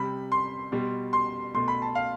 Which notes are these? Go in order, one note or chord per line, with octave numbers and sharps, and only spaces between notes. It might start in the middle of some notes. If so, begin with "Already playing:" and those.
Already playing: C3 G3 B5
C6
B2 G3
C6
B2 A3 C6
B5
A5
F5